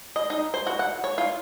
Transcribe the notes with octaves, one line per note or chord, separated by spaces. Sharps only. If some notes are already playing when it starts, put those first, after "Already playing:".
D#5
D#4
C5
F#4
F#5
C#5
F4